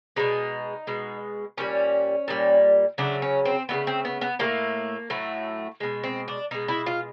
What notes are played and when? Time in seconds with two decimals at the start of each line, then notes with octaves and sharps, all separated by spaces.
0.16 B2 G#3 D#4
0.87 B2 G#3
1.57 A#2 G3 C#4
2.28 A#2 G3
2.98 C#3 F#3 A3 D4
3.22 C#4
3.45 C4
3.69 F#3 A3 B3
3.73 C#3
3.87 C4
4.05 B3
4.21 B3
4.39 F#3 A3 A#3
4.44 A2
5.10 A2 F#3 A3
5.80 B2 G#3
6.04 C4
6.28 D4
6.51 B2 G#3 D#4
6.68 E4
6.86 F4